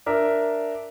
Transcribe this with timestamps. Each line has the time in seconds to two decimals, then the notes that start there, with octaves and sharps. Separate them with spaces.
0.06 D4 A#4 E5